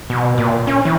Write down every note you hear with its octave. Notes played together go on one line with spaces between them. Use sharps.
B2
A#2
C#4
E3